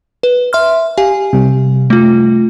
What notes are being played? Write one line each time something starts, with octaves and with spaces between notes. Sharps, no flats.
B4
E5 C6 F6
G4 F5 G#5
C3 G3
A3 F4